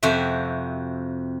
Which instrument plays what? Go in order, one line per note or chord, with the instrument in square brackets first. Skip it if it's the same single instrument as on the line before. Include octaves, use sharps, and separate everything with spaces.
[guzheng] F2 C3 F#4 E5